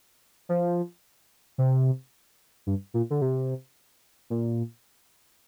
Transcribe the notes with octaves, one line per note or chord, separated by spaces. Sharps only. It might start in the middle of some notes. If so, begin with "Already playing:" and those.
F3
C3
G2
A#2
D3
C3
A#2